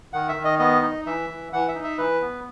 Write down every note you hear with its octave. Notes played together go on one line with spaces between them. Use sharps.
D#3 F#5
E5
D#3
D#5
B3 D#5
D#4
E3 E5
E3
E3 F#5
E5
D#4
E5
E3 B4
B3